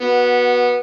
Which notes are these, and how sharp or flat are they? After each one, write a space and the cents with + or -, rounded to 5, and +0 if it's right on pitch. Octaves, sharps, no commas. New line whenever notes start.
B3 -15 F#4 +0